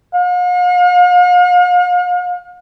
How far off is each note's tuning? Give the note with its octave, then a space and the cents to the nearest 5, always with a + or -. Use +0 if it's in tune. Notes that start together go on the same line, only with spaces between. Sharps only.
F5 +45